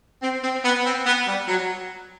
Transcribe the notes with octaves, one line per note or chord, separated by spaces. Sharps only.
C4
C4
B3
C4
B3
G3
F#3